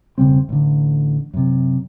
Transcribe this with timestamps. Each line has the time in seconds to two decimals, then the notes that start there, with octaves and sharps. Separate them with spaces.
0.18 E1 C#3 G3 C4
0.49 A1 D3
1.34 F#2 C3